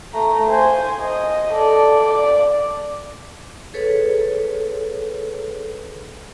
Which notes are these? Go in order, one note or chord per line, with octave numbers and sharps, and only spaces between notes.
A3 A#5
C5 G#5
D#5
A4 D5
D5
G#4 A4 B4 C#5